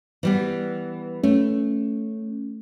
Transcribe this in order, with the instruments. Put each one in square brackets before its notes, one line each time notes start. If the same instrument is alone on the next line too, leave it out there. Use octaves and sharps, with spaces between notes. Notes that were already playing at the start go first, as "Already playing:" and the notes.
[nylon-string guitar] E3 G3 B3
[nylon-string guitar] A3 [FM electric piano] C#4